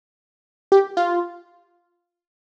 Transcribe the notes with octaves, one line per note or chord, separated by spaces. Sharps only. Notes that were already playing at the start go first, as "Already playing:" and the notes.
G4
F4